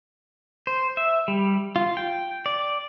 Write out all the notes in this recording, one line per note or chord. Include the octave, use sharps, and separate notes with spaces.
C5
E5
G3
F4
G5
D5